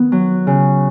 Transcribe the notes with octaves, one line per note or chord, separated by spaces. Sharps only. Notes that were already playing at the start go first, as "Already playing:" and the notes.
Already playing: D#3 B3
F#3
C#3